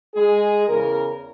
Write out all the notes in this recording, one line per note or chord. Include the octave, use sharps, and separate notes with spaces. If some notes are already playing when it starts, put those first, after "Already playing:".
G#3 G#4
E2 C#3 A#4